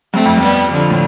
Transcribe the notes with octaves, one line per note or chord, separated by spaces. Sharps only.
G2 A3 C4
F2
G2 G3 B3
D3 F3
A2